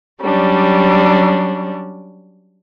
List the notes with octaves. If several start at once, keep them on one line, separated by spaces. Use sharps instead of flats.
F#3 G3 C#4 D4